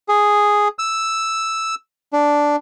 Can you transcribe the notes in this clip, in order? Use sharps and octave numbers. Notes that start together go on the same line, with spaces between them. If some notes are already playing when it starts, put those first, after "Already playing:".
G#4
E6
D4